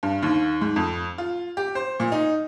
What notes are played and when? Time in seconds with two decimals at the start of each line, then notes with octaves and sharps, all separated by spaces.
0.03 G2
0.22 D#2
0.61 G#2
0.76 F2
1.18 F4
1.57 G4
1.75 C5
2.00 A#2
2.12 D#4